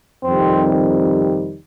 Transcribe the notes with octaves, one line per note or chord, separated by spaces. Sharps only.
F2 C3 D#3 G3 C4